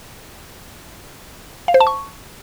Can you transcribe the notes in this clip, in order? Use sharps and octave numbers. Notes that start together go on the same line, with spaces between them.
F5
C5
A5
C#6